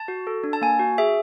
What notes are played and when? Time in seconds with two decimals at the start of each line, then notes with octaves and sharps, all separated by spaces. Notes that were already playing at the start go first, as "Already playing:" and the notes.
Already playing: A5
0.08 F#4
0.27 A4
0.44 D4
0.53 A5
0.61 A#3 G#5
0.79 F#4
0.98 G#4 E5